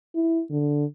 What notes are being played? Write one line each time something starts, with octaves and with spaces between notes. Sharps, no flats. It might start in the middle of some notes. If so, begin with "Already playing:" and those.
E4
D3